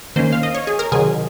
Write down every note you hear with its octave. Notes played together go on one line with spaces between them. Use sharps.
D#3 A#3 C#4 C5
F5
D#5
C#5
G#4
A#4
C3 D#3 F#3 G#4